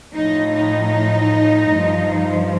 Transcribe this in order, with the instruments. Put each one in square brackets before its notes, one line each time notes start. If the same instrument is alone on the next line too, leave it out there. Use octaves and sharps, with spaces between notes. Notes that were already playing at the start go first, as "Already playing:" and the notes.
[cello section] A2 F3 D#4
D#4
G2 F3